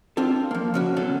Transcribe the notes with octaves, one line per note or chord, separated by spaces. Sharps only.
C4 D4 F4 A4
F3 A#3
C#3 C#4 F#4
D2 B2 F#3 C#4 A4